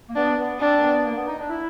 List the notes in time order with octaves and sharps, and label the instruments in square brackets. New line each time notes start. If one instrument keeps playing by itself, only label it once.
[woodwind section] A#3
[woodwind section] B3 [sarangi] D4
[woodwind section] B3
[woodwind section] C4 [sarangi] D4
[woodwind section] A#3
B3
A#3
B3
D#4
D4
E4